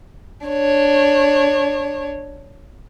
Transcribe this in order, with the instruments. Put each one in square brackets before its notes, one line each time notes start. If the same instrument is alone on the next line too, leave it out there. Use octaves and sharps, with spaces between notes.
[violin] D4 C#5